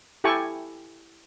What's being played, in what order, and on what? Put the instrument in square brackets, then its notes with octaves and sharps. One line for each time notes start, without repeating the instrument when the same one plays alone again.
[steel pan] E4 G4 A4 G5 G#5 C#6